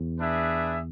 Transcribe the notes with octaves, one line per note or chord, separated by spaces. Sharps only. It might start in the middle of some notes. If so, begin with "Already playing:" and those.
Already playing: E2
D4 G#4 B4 E5